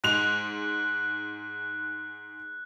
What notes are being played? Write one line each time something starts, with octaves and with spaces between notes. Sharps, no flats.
G#2 G#3 F#6 F7